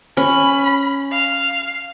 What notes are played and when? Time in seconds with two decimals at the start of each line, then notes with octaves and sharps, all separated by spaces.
0.17 C#4 B5
1.11 F5